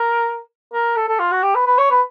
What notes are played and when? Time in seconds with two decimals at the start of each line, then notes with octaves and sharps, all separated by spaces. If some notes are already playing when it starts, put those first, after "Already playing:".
Already playing: A#4
0.73 A#4
0.96 A4
1.08 A4
1.19 F4
1.31 F#4
1.43 G4
1.55 B4
1.66 B4
1.78 C#5
1.91 B4